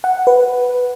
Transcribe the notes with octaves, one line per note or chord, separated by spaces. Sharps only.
F#5
B4